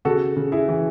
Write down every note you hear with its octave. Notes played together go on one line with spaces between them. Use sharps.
C#3 F#4 A4
C#3
E4 G#4
E3